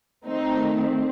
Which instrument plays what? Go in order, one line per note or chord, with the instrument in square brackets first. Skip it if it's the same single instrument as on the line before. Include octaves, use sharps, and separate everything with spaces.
[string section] D#3 A3 C4 D#4
C4